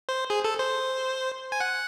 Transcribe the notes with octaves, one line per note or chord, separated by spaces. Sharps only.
C5
G#4
A4
C5
G#5
F#5